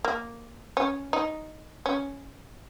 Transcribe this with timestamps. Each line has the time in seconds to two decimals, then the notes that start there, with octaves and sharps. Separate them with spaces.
0.05 A#3
0.77 C#4
1.13 D#4
1.86 C#4